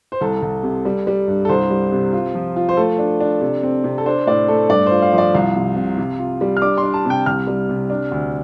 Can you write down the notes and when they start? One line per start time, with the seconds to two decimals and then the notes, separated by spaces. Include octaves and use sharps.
0.12 C5
0.21 C2 A4
0.42 C2
0.63 C3
0.85 G3
1.07 G3
1.28 G2
1.45 A4
1.49 C2 C5
1.70 G3
1.92 C3
2.13 F4
2.34 F3
2.56 F4
2.69 C5
2.77 A3 A4
2.98 D4
3.20 D4
3.41 C3
3.63 C4
3.84 C3
3.98 A4
4.06 D4 C5
4.27 A2 D5
4.48 A3 A4
4.69 G2 D5
4.86 F4 C5
5.02 F5
5.12 F3 C5
5.18 D5
5.34 C2 F5
5.56 C3
5.76 C3
5.98 C3
6.19 F4
6.41 G3
6.57 F6
6.62 D4 D6
6.78 C6
6.83 D4
6.94 A5
7.05 C3 G5
7.26 C2 F6
7.47 G3
7.69 C3
7.90 D4
8.11 D2